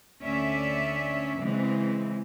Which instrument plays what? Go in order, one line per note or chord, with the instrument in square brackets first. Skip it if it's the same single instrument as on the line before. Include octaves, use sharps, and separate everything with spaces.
[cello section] D2 C#4 D5 E5
C#3 E3 G#3 C4